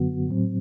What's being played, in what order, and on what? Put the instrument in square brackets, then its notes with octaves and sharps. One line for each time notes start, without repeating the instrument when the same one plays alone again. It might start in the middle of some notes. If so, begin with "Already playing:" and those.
Already playing: [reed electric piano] F#2 D3 F#3 B3 F#4
A2 F#3 C4